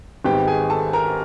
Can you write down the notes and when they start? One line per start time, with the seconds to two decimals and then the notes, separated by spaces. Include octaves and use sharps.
0.25 G#1 G#2 D#3 G3 B3 G4 G5
0.47 G#4 G#5
0.70 A4 A5
0.93 A#4 A#5